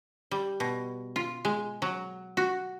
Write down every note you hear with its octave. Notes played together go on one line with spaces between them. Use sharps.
G3
B2
F4
G#3
F#3
F#4